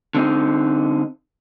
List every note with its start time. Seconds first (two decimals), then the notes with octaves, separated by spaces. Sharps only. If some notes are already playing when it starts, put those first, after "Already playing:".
0.15 D3 C4 D#4